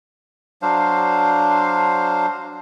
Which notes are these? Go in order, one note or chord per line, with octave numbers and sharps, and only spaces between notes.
F#3 D4 C5 F5